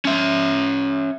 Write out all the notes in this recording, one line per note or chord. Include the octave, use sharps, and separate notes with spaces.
C#4 E5